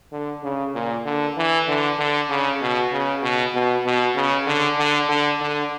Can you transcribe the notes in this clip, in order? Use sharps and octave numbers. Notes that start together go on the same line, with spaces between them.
D3
C#3
A#2
D3
E3
D3
D3
C#3
B2
C#3
B2
B2
B2
C#3
D3
D3
D3
D3